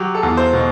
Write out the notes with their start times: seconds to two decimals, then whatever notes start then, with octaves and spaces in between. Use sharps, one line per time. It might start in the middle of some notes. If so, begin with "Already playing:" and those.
Already playing: F#3 G4
0.15 A4
0.23 E2
0.37 C5
0.53 B2